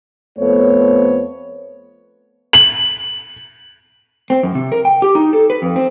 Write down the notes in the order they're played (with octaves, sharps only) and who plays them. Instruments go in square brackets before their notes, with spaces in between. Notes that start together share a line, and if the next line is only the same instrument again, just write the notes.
[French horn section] F2 A3 B3 C5 C#5
[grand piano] F#7
[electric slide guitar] C4
F#2
C3
A#4
G5
G4
D#4
A4
B4
F2
C4